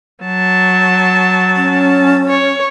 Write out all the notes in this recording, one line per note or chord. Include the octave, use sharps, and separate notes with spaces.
F#3 A5
C#4
C#5